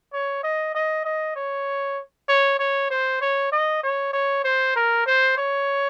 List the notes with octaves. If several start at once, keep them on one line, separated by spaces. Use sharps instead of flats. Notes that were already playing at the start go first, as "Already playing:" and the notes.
C#5
D#5
D#5
D#5
C#5
C#5
C#5
C5
C#5
D#5
C#5
C#5
C5
A#4
C5
C#5